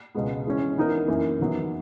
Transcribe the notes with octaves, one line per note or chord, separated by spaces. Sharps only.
C#2 B2 G#3 B3
E3 G#3 C#4
E3 B3 D#4 A#4
F#2 E3 A#3 E4
E2 D#3 F#3 B3 E4